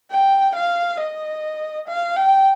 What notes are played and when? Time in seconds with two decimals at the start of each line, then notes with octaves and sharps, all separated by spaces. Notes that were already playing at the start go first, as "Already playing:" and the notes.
0.11 G5
0.55 F5
1.00 D#5
1.88 F5
2.16 G5